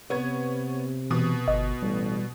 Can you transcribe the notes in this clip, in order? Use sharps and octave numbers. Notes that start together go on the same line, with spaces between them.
C3 B3 C#5 G#6
B2 E3 D#6
G1 D#5
A1 G3